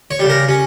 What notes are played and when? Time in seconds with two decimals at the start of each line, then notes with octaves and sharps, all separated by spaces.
0.11 C#5
0.19 C#3 G3
0.30 A#4
0.49 C#4